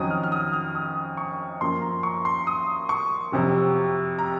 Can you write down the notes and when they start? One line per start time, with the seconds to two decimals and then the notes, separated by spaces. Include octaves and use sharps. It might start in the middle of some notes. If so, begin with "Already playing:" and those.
Already playing: F2 D#3 F#3 C#4 D#6
0.10 F6
0.23 F6
0.32 D#6
0.53 F6
0.75 D#6
1.17 C#6
1.61 F#2 F3 A#3 C6
1.82 A#5
2.03 C#6
2.25 C6
2.47 D#6
2.89 C#6
3.32 F2 C3 F#3
4.19 A#5